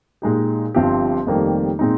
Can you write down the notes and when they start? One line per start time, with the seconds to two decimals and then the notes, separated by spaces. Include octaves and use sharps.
0.22 A#2 G#3 D#4 G4
0.75 G1 G2 F3 C4 G4
1.27 F1 F2 D#3 G3 A#3
1.79 A#2 G#3 C4 D#4